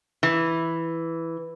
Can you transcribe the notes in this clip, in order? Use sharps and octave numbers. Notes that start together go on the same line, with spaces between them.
E3